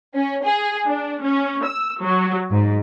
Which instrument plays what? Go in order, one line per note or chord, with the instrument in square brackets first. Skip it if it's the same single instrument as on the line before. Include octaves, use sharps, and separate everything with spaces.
[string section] C#4
G#4
D4
C#4
E6
F#3
G#2